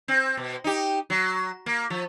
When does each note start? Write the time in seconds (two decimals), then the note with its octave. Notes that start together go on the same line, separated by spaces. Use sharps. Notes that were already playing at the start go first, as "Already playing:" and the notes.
0.08 C4
0.37 B2
0.64 D#4 G4
1.10 F#3
1.66 A#3
1.90 F3